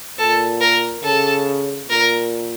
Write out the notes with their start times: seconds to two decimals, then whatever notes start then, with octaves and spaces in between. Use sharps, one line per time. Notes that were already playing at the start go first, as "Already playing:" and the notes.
0.18 A#2 A4
0.61 A#4
1.04 C#3 A4
1.89 A#2 A#4